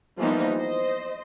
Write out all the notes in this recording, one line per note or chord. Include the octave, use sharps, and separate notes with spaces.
E3 F3 G3 A#3 B3 D#4
C5 D#5